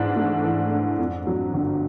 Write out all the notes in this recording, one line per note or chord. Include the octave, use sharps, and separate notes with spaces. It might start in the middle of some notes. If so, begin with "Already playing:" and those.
Already playing: G#2 E3 D4
A3
E3
D4
F2
F#3
G1